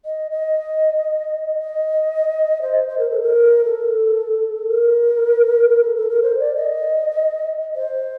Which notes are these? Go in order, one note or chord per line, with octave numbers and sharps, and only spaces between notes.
D#5
D#5
D#5
C5
C5
A#4
A4
A#4
A4
A#4
A#4
A4
A4
A#4
C5
D5
D#5
C5